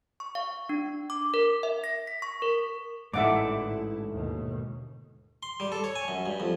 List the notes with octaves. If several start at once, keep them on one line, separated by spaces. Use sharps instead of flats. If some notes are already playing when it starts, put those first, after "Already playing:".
C#6
F5
D4
D6
A#4
E5
A#6
B6
C#6
A#4
A1 G#2 D3 A3 E4 E5 F#5 D6
D#2 B2
C6
G3
A4
C#5
G#5
F#2
G2
F2